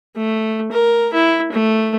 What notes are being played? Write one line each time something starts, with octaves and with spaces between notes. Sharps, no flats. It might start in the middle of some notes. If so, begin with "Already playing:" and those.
A3
A#4
E4
A3